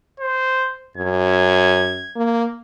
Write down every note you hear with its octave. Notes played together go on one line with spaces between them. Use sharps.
C5
F#2 G#6
A#3